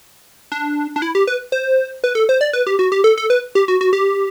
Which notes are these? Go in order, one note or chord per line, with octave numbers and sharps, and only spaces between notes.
D4
D4
E4
G4
B4
C5
B4
A4
C5
D5
B4
G4
F#4
G4
A4
A4
B4
G4
F#4
F#4
G4